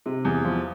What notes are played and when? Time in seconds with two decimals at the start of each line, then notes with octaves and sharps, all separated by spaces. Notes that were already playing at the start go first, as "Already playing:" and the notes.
0.06 C3
0.25 E2
0.45 F3